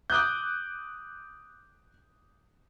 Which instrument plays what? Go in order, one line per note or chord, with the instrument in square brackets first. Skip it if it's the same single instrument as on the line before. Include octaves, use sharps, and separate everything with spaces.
[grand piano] D6 D#6 F#6 G6